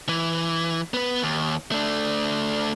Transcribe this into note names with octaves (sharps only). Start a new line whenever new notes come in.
E3
B3 B4
D#2
A3 D4